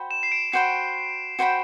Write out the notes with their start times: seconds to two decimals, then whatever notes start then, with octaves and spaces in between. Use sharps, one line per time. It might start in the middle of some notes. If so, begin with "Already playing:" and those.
Already playing: F#4 C5 G5 B5
0.11 E7
0.23 C7
0.32 D7
0.52 F#4 C5 G5 B5 C7
1.39 F#4 C5 G5 B5